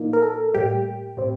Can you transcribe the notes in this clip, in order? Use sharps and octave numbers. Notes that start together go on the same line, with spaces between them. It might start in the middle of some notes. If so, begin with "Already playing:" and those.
Already playing: A#2 F3 A#3 D#4
A#4
A4
A2 G3 A#3 G4
A2 G3 C4